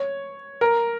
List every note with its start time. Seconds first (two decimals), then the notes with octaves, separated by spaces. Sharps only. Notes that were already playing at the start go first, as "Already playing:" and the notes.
Already playing: C#5
0.61 A#4